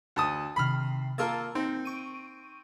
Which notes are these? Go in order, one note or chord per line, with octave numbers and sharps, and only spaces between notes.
D2 A5 D#6
C3 D#3 B5 F6 C7
A#3 F4 A#4 A5 E6 A6
C4 D#4
C#6 D7 D#7